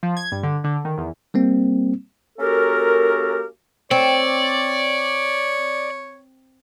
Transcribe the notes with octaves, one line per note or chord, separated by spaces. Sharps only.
F3
G#6
G2
D3
D3
D#3
E2
G3 A#3 C4
A#3 C#4 F#4 G4 A4 A#4
C4 C#5 D5